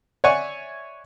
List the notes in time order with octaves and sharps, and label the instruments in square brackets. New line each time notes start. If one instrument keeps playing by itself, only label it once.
[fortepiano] C#5 D5 E5 F#5 G#5 C#6